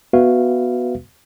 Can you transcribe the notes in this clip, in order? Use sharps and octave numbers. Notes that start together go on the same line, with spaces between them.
B3 F#4 B4 E5 F5